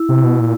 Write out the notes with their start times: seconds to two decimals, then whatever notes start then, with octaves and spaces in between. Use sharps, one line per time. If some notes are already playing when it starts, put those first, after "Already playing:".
Already playing: E4
0.09 C3
0.24 B2
0.40 A#2